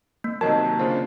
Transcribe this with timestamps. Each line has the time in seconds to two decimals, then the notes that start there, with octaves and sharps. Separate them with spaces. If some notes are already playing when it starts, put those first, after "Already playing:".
0.24 A#3
0.41 C3 D#3 F#3 A#4 D#5 A5
0.79 C#3 D4 F4 C5